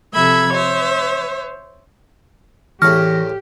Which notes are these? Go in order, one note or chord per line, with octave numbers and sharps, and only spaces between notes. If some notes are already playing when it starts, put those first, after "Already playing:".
C3 F3 A4 E5 B5 G#6
C5 C#5 E5
E2 A2 E3 G4 A5 C#6 F6 A#6